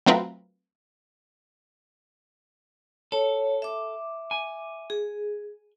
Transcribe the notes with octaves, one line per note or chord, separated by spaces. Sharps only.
F#3 A3 C4 F4 A#4 B4
A4 C#5
E5 D6
G#5
G#4